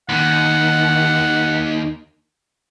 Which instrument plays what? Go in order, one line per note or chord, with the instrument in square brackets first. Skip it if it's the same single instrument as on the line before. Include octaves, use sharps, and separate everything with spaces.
[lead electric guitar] D#2 D#3 [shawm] F#5